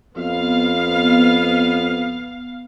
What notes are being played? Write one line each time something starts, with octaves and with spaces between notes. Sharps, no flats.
F2 B3 F5